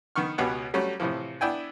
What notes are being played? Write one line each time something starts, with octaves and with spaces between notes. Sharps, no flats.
D#3 B3 C#6 F6
C#2 B2 B3 G4 C#5 F#5
F#3 G3 A3 C#4
A2 C3 E3 F3
B3 D4 E4 G5 G#5